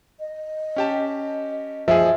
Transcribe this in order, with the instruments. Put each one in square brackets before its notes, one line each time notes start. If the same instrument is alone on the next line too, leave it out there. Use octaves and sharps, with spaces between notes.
[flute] D#5
[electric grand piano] C#4 G4 A5
[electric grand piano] F3 G#4 [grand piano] E5